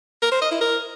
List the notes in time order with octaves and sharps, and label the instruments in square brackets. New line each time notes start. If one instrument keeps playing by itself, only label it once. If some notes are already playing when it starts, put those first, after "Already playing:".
[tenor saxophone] A#4
C5
D#5
E4
A#4